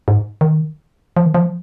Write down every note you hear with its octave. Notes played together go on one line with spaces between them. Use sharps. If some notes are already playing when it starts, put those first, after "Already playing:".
G#2
D#3
F3
D#3
F3